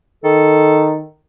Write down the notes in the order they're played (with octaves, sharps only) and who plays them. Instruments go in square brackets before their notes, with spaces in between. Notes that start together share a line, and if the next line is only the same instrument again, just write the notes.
[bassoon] D#3 [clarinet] A4